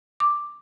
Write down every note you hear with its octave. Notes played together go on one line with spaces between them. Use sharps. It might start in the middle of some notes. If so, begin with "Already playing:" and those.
D6